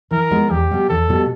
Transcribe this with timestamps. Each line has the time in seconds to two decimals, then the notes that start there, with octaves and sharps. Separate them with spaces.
0.11 E3 A#4
0.31 G#3 B3 D#4
0.50 E2 G4
0.71 B2 G3 B3
0.89 E2 A4
1.09 B2 G3 B3